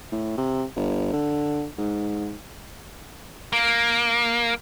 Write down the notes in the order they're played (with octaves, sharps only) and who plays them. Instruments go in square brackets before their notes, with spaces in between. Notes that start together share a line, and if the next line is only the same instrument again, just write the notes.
[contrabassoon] A2
C3
G1
D3
G#2
[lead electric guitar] A#3